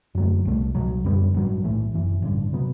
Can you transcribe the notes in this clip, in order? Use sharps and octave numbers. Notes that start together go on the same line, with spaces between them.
F#2 D3 F#3 A3
C2 B2 A3
C2 B2 F#3
F#2 D3 G3 B3
A1 G2 F#3
B1 A2 E3 A3
F#1 F#2 E3
A1 G2 D3
C3 F#3 B3